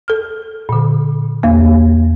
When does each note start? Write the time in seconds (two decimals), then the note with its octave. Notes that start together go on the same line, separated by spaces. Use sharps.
0.08 A4 F6
0.69 A#2 D3
1.43 E2 A#3